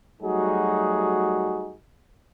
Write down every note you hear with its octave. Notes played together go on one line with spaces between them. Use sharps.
F#3 G3 A3 D#4 F#4 G#4